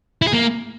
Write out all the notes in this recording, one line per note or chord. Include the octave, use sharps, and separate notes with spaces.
E4
G#4
A#3